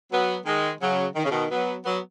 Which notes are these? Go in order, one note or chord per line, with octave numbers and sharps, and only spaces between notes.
F#3 B3
D#3 G#3
C#3 F#3
D#3
C#3
B2 D#3
F#3 B3
F#3 B3